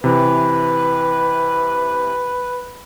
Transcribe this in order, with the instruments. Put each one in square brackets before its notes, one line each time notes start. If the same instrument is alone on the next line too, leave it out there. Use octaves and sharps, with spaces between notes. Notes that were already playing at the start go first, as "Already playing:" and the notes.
[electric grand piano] C3 E3 [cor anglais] B4